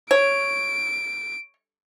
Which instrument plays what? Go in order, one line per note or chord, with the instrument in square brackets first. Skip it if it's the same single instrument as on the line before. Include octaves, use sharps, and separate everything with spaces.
[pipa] C#5 [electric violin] D7